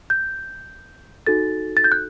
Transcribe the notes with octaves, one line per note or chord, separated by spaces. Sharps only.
G6
D#4 F#4 A4 A6
A6
G6
F#6